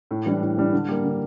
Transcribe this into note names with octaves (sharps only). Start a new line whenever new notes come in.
A2
E3 G3 D4
A2
E3 G3 D4
D3
G3 A#3
D3